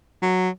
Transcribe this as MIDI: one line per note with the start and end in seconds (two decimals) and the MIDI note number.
0.22 0.49 54